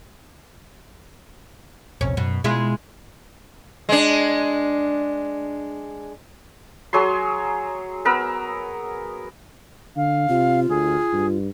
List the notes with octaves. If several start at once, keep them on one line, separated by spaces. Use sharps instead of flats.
E1 A#1 C3 C#4
F#2 B2
B2 G#3 E4 F4
G#3 D4
F#3 G#4 C#5 C6
B3 A#4 E6
D3 F5
C3 F4
D2 G#4
G2